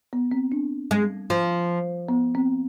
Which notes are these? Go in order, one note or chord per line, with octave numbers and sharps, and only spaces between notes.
B3
C4
D4
G#3
F3
B3
C4